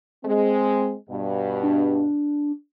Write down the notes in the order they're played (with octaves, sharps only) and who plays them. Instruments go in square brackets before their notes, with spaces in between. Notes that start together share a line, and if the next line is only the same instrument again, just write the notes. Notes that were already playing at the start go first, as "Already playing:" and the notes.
[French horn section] G#3 C4
G2 B2
[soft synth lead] D4